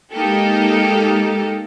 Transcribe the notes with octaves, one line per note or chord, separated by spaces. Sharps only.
G#3 A#3 D#4 G4 A4